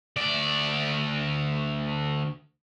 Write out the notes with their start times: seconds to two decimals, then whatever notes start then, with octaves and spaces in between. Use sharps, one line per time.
0.17 D2 D5